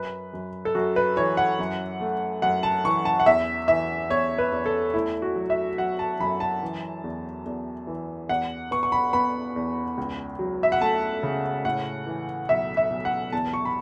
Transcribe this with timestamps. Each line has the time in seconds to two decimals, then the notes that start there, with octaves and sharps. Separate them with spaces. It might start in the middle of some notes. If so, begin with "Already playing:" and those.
Already playing: F#2 B4
0.33 F#2
0.65 A4
0.75 F#2 F#4
0.96 B4
1.16 E3 C#5
1.37 F#5
1.59 F#2
2.01 A3
2.42 F#2 F#5
2.63 A5
2.85 E3 C#6
3.05 A5
3.20 F#5
3.26 E2 E5
3.68 E3 E5
4.10 E2 C#5
4.38 B4
4.52 E2
4.66 A4
4.94 A3 E4
5.22 F#4
5.36 F#3
5.50 E5
5.78 F#3 F#5
5.99 A5
6.20 F#2 B5
6.40 A5
6.62 E3
7.04 E2
7.46 E2
7.87 E3
8.29 E2 F#5
8.71 B3 C#6
8.83 C#6
8.92 B5
9.13 B3 B5
9.56 E2
9.97 C#2
10.39 F#3
10.63 E5
10.72 F#5
10.81 A3 A5
11.23 C#3
11.65 A2 F#5
12.06 E3
12.49 B1 E5
12.77 E5
12.90 B1
13.05 F#5
13.32 E2 A5
13.53 C#6
13.65 B5